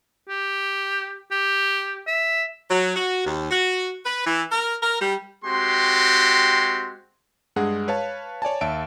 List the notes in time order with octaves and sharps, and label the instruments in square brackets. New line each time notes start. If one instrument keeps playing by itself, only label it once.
[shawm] G4
G4
E5
[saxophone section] F#3
F#4
D#2
F#4
B4
E3
A#4
A#4
G3
[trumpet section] G#3 C4 F#4 G4 C6
[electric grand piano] G2 G#3 G#4 F#5
B4 C#5 F5 A5
C#5 D5 G#5 A5
D#2 E5 A5 D7